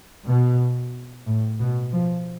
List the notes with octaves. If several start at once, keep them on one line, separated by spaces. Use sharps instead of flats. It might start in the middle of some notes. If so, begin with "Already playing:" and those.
B2
A2
B2
F3